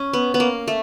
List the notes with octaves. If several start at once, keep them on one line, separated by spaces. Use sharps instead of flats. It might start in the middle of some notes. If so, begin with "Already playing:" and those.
Already playing: C#4
B3
B3
A#3
A3